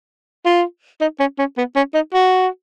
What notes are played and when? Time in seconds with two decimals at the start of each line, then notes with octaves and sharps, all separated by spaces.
0.45 F4
1.01 D#4
1.20 C#4
1.38 C#4
1.57 B3
1.76 C#4
1.94 D#4
2.14 F#4